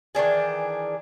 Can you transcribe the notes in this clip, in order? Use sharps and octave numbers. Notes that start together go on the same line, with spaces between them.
D#3 E3 D4 G#4